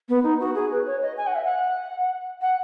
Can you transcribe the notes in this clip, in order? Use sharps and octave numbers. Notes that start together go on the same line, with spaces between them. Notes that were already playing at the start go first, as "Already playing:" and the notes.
B3
D#4
F#4
G#4
B4
C#5
D#5
G#5
F#5
E5
F#5
F#5